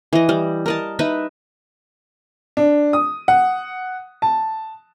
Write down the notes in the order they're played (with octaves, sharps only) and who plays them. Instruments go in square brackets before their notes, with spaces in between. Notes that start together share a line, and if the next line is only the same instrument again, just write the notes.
[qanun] E3 D#5
G3
A#4 D#5 A5
D#4 B4 D#5 E5
[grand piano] D4
D#6
F#5
A5